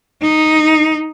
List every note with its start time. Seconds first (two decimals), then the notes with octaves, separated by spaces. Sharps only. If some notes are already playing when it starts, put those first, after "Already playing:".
0.21 D#4